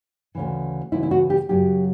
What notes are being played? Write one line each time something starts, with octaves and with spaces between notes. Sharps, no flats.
D2 C#3 E3
D2 C#3 E3 E4
E4
F#4
G4
F#2 C#3 F#3 G4